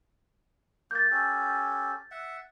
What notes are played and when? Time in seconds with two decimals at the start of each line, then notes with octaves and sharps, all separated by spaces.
0.91 A#3 G6 A6
1.11 C#4 G4 A4
2.11 E5 F#5